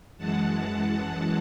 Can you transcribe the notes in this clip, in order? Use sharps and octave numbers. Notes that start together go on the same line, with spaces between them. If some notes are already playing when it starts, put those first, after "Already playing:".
F#2 E3 G#3 F#5 A5